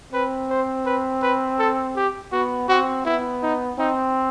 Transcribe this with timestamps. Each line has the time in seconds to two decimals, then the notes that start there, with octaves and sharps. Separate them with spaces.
0.12 C4 B4
0.50 C5
0.85 B4
1.22 B4
1.59 A4
1.96 G4
2.32 B3 F#4
2.69 C4 F#4
3.05 B3 E4
3.43 D#4
3.78 C4 D#4